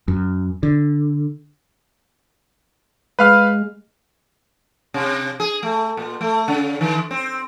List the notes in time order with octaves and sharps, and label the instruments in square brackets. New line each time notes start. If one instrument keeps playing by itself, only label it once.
[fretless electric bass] F#2
D3
[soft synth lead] G#3 [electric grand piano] B4 F5 F6
[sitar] C3
G#4
A3
A#2
A3
C#3
D#3
C4